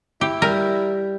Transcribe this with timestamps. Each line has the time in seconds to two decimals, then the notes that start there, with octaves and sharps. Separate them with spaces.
0.21 E4 G4
0.42 G3 A#4